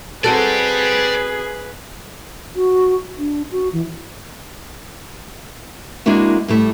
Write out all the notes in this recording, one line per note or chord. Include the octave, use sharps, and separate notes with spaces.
C4 F#4 G#4 A4 B4 D5 G5
F#4
D4
F#4
E3
G#3 A#3 D4 E4 F#4
A2 G3 A3